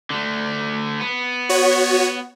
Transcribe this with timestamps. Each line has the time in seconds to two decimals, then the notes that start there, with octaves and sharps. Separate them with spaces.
0.10 D3 A3
1.00 B3
1.49 F#4 C#5